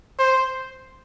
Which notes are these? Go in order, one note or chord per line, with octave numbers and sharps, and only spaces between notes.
C5